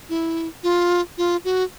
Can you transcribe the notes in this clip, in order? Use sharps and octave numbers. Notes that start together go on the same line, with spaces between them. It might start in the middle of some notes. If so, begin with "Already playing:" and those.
E4
F4
F4
F#4